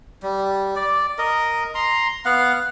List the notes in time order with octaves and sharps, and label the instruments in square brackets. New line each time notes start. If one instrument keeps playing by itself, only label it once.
[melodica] G3
D5
A#4 D#5
A#5 C6
B3 F5 F#5